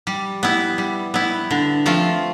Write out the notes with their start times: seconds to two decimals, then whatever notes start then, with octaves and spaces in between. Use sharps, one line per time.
0.07 G3
0.43 B3 E4
0.78 G3
1.14 B3 E4
1.51 D3
1.86 F3 A3 C4 F4